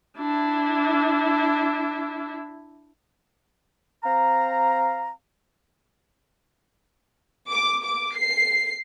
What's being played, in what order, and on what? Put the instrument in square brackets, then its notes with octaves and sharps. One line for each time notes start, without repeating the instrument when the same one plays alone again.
[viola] D4 E4
[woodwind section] C4 F5 A#5
[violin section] D6
D6
C7